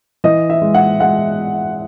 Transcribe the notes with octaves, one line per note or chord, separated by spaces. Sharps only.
E3 D#5
E5
G#3
F#5
G#3 F#5